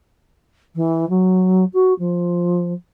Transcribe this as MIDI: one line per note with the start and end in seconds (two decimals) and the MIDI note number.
0.76 1.08 52
1.09 1.65 54
1.74 1.93 66
1.99 2.73 53